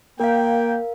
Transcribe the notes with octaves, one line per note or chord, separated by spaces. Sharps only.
A#3 A#4 F5 G5